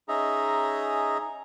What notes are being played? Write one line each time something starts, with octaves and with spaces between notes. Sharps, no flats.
C#4 D#4 G#4 D#5 E5 A#5